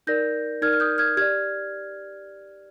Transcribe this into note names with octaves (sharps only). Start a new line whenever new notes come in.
D#4 A#4 D5 G6 A#6
D#4 A#4 D5 F6 G#6
F6
D#6 G6
F6 G#6
G4 D5 F6 G#6